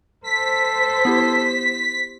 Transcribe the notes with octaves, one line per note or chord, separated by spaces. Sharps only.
A4 C5 B6
B3 E4 G4